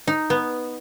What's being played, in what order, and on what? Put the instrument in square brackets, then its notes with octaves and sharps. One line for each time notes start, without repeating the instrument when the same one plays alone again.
[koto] D#4
B3